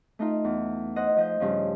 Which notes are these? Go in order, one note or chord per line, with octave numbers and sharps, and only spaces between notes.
A3 D#4 F4
E2
C5 D#5 F#5
F3 D#5 G6
G2 C#3 F3